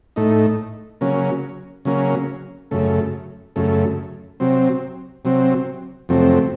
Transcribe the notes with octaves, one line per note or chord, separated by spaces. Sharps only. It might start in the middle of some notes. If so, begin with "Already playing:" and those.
A2 A3 D#4
C#3 F#3 A#3 C#4
C#3 F#3 A#3 C#4
F#2 C#3 A3
F#2 C#3 A3
C3 F#3 C4
C3 F#3 C4
F2 C3 F#3 A3 C4